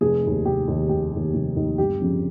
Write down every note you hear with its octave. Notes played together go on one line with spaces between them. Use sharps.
F1 G#4
D#2 D#3
F1 G4
D#2 D#3
F1 G4
D#2 D#3
F1
D#2 D#3
G1 G4
F2 C#3 F3